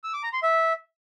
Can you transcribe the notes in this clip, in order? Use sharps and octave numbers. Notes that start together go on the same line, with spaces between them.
E6
D6
A#5
C6
E5